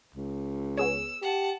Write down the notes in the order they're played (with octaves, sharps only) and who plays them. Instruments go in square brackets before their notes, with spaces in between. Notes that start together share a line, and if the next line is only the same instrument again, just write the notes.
[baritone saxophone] C#2
[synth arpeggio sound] B3 G#4 C#5 [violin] E6
[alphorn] G4 [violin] F#5 A5